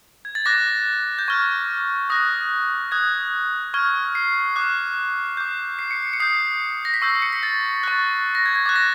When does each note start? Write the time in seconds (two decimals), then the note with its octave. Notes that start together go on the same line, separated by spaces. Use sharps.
0.25 G#6
0.35 A6
0.46 D6 F#6 A#6
1.19 G6
1.28 C#6 F6 G#6
2.10 D#6 F#6 A#6
2.91 D#6 F#6 G#6
3.74 C#6 F6 G#6
4.15 C7
4.56 D6 F#6
5.37 D6 G6
5.79 C7
5.91 C#7
6.03 C7
6.13 C#7
6.20 D#6 G6 C7
6.85 A#6
6.94 B6
7.02 C#6 E6 G6 C7
7.22 C#7
7.33 B6
7.43 A6
7.83 C#6 F#6 A6
8.35 A#6
8.46 G#6
8.56 G#6
8.66 D6 F#6 A6
8.76 A#6